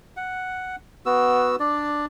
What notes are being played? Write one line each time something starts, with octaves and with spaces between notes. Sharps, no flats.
F#5
B3 F#4 E6
D4 D5